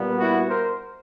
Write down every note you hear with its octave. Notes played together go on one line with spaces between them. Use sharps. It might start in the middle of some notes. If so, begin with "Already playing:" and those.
Already playing: A#2 G3 B3
E4 F#4
A#4 C5